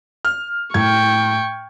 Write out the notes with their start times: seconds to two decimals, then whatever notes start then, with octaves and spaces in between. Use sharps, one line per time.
0.25 F6
0.74 A2 G5 C#6 G#6